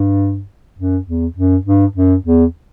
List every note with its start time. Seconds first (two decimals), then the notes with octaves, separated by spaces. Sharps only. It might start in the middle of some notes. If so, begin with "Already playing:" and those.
Already playing: G2
0.78 F#2
1.06 E2
1.36 F#2
1.65 G2
1.95 F#2
2.24 E2